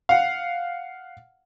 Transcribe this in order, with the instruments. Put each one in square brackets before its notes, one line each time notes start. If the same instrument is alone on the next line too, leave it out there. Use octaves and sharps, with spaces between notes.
[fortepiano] F5 F#5